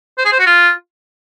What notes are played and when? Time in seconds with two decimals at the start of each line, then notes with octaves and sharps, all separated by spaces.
0.18 C5
0.25 G#4
0.32 C5
0.39 F#4
0.46 F4